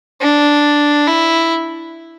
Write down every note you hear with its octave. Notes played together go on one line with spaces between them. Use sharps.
D4
E4